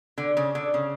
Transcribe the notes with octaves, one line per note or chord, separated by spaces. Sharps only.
D3
C#3
D3
C#3